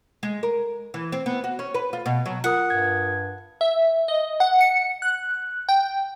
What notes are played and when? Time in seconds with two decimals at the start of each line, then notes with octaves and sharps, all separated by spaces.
0.23 G#3
0.43 A#4
0.94 E3
1.12 C4
1.26 B3
1.44 F#4
1.59 C#4
1.74 B4
1.93 F4
2.06 B2
2.26 F#3
2.44 F4 A#4 F#5 D#6
2.70 G2 G#6
3.61 E5
4.08 D#5
4.40 F#5
4.61 C#7
5.02 F#6
5.69 G5